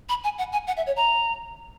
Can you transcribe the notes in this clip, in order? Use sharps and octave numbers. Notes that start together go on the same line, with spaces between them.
B5
G#5
F#5
G#5
F#5
E5
C#5
A#5